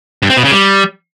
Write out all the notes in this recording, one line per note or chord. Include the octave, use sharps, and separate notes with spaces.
G2
C4
B2
C#3
G3